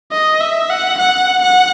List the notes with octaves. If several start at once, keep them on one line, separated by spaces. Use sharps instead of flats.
D#5
E5
F#5
F#5
F#5